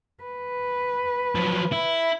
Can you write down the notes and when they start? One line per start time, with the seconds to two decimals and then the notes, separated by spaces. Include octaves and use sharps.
0.24 B4
1.35 F3 F#3
1.72 E4